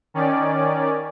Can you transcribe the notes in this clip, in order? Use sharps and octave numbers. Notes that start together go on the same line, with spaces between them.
D#3 C#4 D5